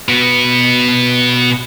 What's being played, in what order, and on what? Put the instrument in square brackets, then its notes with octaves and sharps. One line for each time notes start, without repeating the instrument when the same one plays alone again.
[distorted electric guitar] B2 B3